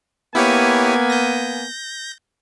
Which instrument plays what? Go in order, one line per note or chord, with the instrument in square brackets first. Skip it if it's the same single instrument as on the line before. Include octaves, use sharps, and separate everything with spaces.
[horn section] A#3 B3 G#5 [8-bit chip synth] E4 G4 C#5
[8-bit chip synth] G6 A#6